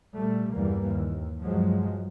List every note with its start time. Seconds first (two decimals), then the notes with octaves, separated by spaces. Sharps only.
0.18 A#2 G3 A3
0.55 E2 G2 E3 G3 A#3
0.87 D#2
1.41 G2 F3 F#3 G#3